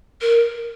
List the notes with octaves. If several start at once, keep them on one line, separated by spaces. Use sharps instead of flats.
A#4